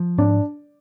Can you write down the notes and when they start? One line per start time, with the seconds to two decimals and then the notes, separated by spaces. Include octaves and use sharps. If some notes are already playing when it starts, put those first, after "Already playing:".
Already playing: F3
0.18 G#2 D4 D5